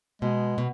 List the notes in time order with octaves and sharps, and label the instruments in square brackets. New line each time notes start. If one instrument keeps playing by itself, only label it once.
[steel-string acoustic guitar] B2 [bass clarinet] G#3
[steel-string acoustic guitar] B2